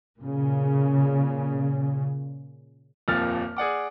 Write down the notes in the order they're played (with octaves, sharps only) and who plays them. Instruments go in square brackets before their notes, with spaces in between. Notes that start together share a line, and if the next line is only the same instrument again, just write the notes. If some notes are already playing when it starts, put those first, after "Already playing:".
[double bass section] A#2 C#3
[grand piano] D#1 F2 A#2 F3 F6 A6
G#4 D5 F#5 D6